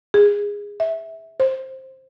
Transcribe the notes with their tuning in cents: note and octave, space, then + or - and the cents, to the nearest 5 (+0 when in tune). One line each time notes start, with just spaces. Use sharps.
G#4 -15
E5 -15
C5 +10